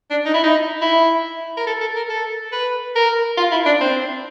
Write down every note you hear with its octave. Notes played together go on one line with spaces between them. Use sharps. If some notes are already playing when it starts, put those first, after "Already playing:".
D4
D#4
E4
D#4
E4
A#4
A4
A4
A#4
A4
B4
A#4
F4
E4
D4
C4